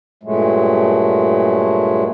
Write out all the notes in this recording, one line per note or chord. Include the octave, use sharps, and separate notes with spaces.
G2 A#2 F#3 G#3 A3